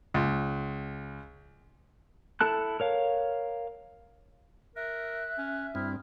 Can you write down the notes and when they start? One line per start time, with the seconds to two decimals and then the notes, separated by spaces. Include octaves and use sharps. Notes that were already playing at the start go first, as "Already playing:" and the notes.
0.14 C#2
2.41 E4 A4 A5 F#6
2.80 A#4 C#5 F5
4.76 A#4 E5 F#6
5.38 C#4
5.75 G2 C4 E4 C5 D#6 F6